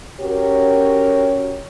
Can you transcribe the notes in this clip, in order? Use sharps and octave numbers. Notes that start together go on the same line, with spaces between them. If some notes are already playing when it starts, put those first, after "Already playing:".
C#4 F#4 G4 A#4 C#5